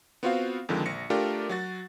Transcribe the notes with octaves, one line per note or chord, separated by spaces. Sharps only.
B3 C4 F4 F#4 C5 F5
F2 D3 D#3 F3 G#3
A#1 A#6 C#7
A3 D4 F4 G4 A#4 D5
F#3 F#4 A6